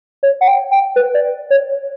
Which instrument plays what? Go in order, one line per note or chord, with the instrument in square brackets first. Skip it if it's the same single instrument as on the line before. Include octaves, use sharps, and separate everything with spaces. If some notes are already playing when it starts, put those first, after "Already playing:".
[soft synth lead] C#5
F#5
G5
G5
B4
D5
C#5